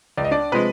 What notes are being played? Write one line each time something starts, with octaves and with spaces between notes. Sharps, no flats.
C#2 D5
D#5
D4 D5
C3 F3 G#3 B4